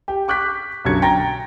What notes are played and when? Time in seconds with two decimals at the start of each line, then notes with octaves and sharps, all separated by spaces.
0.08 G4
0.28 C#6 D6 F#6 G6 B6
0.85 B1 F#2 D3 F#3 G#6 C#7
1.02 G5 A#5 A6 A#6